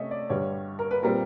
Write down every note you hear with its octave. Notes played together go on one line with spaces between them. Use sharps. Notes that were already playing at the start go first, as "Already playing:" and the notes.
Already playing: C3 A3 C#4 D#5 E5
D5
G2 D3 G3 C#5
A#4
B4
A#2 G3 C4 A#4